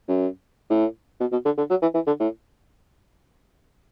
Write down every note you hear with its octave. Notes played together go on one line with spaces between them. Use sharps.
F#2
A2
B2
B2
D3
D3
F#3
E3
E3
D3
A2